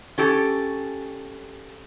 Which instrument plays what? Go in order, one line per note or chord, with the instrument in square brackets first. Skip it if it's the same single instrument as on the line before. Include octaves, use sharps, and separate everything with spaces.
[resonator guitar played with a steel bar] C#4 G4 A4